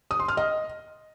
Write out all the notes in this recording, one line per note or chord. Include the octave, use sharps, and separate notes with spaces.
D#6
C6
F6
D#5